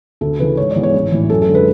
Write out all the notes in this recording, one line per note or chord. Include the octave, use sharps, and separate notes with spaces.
D2 A4
C#3 E3 B4
G#2 C#5
D5
E3 G#3 B3
C#5
A1
A2 E3
F#2 A4
A4
D3 G#3
B4